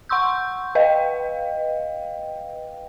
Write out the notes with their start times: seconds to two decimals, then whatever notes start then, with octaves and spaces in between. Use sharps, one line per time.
0.09 F#5 C6 C#6 E6 G6
0.75 B4 D#5 F5 G5